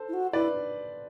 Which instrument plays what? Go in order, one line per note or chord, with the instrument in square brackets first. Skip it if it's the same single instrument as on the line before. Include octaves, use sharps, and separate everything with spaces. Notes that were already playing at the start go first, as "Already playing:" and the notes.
Already playing: [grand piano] A4 C5
[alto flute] E4
F#4
[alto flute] E4 [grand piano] B4 D5